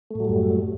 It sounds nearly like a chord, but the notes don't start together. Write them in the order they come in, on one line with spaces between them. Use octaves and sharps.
A3 A2 F#3 G3 F#2